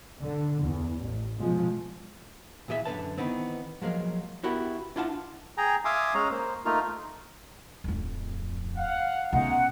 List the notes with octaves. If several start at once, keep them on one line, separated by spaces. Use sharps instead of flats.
D3
E2
A1
B2 F3 G#3
A#2 E3 G#4 D5 E5
F#2 D3 B4 A5
D#3 E3 B3 C4
F3 F#3 G#3 A#3
B3 E4 F#4 G4 A#4
D4 E4 F4 F#5 G#5 A5
G#4 G5 G#5 A#5
E5 F5 G#5 C6 D6 D#6
G#3 C#4 C#5 D#5 A#5
A#3 C5
A3 A#3 D#4 F4
D1 F2
F5 F#5
B2 G#3 A3 C#4 D#4 F#5